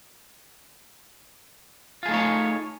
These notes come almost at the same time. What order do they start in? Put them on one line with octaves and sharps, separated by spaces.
F4 G#4 A3 D#4 C#5